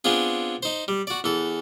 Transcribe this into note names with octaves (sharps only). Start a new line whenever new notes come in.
B3 C4 D4 F4 G#4
D#4 C5
G3
F#4 D5
E2 E3 A4